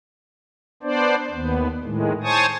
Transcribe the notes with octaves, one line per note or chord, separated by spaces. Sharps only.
B3 D4 C5 D5
D#2 B3
A2 D#3 G#3
C5 C#5 G#5 A5 C#6 D#6